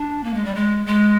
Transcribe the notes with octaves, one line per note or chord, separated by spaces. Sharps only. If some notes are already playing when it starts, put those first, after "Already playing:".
Already playing: D4
A#3
G#3
G3
G#3
G#3